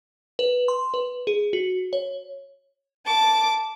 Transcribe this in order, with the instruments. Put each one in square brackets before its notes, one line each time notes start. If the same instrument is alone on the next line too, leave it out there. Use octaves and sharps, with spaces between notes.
[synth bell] B4
C6
B4
G#4
F#4
C#5
[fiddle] A5 D6